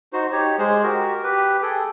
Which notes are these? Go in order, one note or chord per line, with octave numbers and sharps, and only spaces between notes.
D#4 F#4 C5
D#4 G4 C#5
G#3 G#4 C5
F#4 G4 A#4
G4 B4
G#4 A4 G5